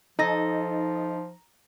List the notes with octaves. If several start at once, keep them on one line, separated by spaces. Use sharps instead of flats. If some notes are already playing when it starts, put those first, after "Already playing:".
F3 D#4 A4 D#5 A#5 A#6